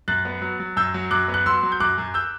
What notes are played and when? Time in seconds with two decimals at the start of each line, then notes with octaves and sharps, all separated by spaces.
0.08 F#2 F#6 A6
0.25 B3
0.42 F#3
0.60 F#3
0.77 F#2 E6 G6
0.94 F#3
1.11 F#2 D6 F#6
1.28 B3
1.34 F#6
1.46 F#3 C6 E6
1.63 F#3
1.72 G6
1.80 F#2 D6 F#6
1.98 F#2
2.14 E6 G6